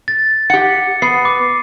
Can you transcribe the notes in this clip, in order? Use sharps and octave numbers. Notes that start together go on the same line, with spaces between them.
A6
G4 F#5 C#7
B3 C7
D6